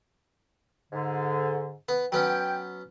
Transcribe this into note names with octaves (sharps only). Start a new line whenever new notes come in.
G#2 D3
B3
F#3 B3 C#4 G5